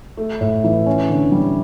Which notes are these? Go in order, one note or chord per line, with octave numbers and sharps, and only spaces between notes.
A3
A2
E3
C#4
D3
G3